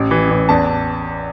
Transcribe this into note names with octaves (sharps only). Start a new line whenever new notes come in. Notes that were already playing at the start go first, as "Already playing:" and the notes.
Already playing: A1
E3
A1
E2 A5